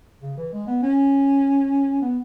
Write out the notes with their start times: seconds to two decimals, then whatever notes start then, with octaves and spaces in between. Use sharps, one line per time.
0.22 C#3
0.38 E3
0.53 G#3
0.67 B3
0.83 C#4
2.02 B3